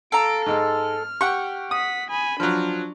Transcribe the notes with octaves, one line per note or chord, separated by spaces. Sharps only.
A4 F5 A#5 D7
G#2 G#3 F6
G4 F#5 G5 C#6
F#5 D#6 B6
G#5 B5
F3 F#3 D4